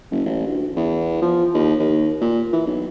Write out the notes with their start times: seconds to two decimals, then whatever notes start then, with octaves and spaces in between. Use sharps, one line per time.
0.11 F#1
0.26 A1
0.46 D2
0.76 E2
1.22 F3
1.54 D#2
1.79 D#2
2.21 A#2
2.53 E3
2.67 B1